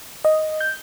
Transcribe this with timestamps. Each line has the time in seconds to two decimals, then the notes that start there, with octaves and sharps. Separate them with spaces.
0.25 D#5
0.61 G6